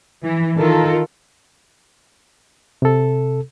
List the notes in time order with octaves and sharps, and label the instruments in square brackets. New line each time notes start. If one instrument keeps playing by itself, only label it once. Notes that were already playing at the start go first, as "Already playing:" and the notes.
[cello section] E3
D#3 F4 A4 A#4
[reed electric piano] C3 A4